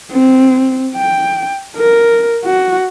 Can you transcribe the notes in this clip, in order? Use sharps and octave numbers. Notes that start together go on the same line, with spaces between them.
C4
G5
A#4
F#4